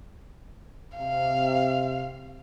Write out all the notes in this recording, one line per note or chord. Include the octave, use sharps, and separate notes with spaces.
C3 F5